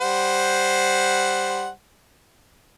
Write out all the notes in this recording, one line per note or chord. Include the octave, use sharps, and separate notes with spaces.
G3 C5 F#5